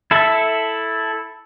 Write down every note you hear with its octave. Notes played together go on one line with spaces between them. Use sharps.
E4 A4 E5